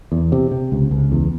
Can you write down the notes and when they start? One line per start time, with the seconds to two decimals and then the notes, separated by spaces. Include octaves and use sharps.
0.12 E2
0.32 C3
0.51 C3
0.72 C#2
0.91 C#2
1.12 E2